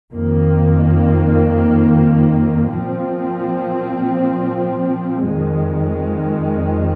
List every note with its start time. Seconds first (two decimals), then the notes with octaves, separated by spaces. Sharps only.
0.12 F2 D#3 A#3
2.70 A#2 F3 C4
5.25 F2 D#3 G#3